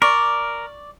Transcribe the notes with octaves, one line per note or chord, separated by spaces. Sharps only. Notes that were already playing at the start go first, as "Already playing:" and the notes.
A#4 D5 C#6